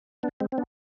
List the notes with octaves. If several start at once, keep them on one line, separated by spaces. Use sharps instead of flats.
B3 D4
G#3 C4
C4
B3 D4